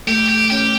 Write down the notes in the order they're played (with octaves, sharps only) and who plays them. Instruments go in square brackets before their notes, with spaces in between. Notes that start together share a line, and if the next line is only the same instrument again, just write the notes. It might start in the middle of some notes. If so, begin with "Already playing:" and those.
[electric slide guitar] A3 [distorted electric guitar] G4
[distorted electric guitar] G4
[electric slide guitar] C#4 [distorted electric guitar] G4